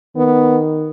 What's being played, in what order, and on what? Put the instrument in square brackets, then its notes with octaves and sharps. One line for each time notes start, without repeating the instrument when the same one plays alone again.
[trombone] D#3 [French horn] B3